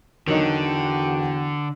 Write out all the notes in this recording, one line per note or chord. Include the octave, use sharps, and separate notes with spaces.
E2 D3 D#3 F#3 D#4 F#4 G5